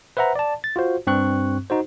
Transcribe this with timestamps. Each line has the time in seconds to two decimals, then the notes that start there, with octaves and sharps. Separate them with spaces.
0.17 B4 C5 E5 F#5 A#5
0.36 D5 A5
0.64 A6
0.76 F4 F#4 C5
1.07 G2 C4 C#6 F#6
1.70 D#4 F#4 C5